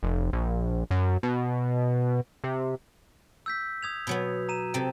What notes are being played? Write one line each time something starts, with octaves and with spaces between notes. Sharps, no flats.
F1
A#1
F#2
B2
C3
E6 G6 B6
D#6 G#6 F7
B2 F#3 B3
A#5 D#7 E7
C3 A4 G5